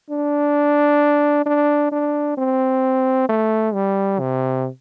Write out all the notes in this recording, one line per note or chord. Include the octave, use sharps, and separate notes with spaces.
D4
D4
D4
C4
A3
G3
C3